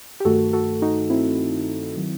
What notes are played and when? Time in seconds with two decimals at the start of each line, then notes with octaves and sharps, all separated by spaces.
0.20 G4
0.25 G2 D#3 A3 F#4 A4
0.53 F#4 A4
0.82 D#4 F#4
1.10 C4 E4
1.97 D#3 F#3